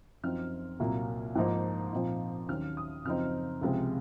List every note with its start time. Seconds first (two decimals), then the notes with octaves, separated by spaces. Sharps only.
0.23 F#2 F3 C4 D#4 F6
0.80 C2 A#2 F#3 A#3
1.35 G#2 F3 A#3 D#4
1.92 A#2 F3 C4 D#4
2.49 D#2 D#3 F#3 C#4 F6
2.77 D#6
3.05 F#2 C#3 F3 C4 D#4 F6
3.61 C#2 C3 F3 G#3